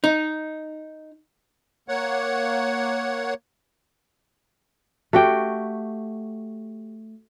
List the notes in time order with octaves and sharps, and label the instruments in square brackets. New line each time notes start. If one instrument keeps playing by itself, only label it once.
[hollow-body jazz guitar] D#4
[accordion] A#3 C#5 F#5
[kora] A3 F#4 G4 G5